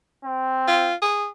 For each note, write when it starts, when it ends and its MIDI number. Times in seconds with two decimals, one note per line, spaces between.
0.24 0.92 60
0.68 0.95 65
1.02 1.27 68